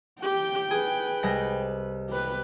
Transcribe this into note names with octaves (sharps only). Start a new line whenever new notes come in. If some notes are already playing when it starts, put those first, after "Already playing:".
G4 G5
G#4 B4
C2 G#3 A#6
G4 B4